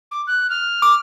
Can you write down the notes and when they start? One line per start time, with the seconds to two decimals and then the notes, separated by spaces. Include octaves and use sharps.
0.11 D6
0.27 F#6
0.49 F6
0.82 D6